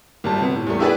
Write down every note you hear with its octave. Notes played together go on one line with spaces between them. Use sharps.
G1 G3 A5
C3 B3
A2
E2 G3 A3
D4 E4 G4 G#4 B4 D5